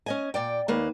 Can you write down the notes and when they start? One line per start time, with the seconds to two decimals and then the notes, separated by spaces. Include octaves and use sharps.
0.06 C#4 D#5 G#5
0.34 A#2 D5 G5
0.68 D#2 A#3 B4